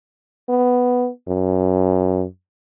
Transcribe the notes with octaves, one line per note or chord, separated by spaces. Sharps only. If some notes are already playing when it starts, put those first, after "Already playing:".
B3
F#2